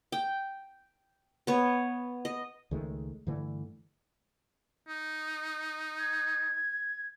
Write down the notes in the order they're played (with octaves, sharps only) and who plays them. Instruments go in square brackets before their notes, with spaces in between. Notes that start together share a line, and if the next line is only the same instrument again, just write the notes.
[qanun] G5
B3 C#5
D#5
[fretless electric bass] C#2 D#3 G#3 A3
G2 D3 E3 A3
[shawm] D#4
[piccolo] G#6